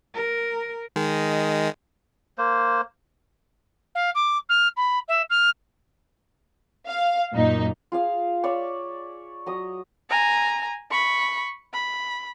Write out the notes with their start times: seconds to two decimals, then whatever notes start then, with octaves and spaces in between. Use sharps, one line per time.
0.14 A#4
0.96 D#3 G#3
2.38 A#3 C5
3.95 F5
4.15 D6
4.49 F6
4.77 B5
5.09 E5
5.30 F6
6.86 F5
7.33 F#2 A#2 D#4
7.92 F4 G#4 F5
8.44 C#5 D5 E5 C#6
9.46 F#3 D#5 D#6
10.10 G#5 A#5
10.91 B5 C#6
11.74 B5